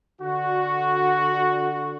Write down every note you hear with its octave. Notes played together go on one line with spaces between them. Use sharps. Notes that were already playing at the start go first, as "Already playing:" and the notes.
D3 F#4